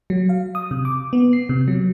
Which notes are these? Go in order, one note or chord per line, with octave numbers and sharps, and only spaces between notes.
F#3
F5
D#6
C3
D6
B3
C7
C3
F#3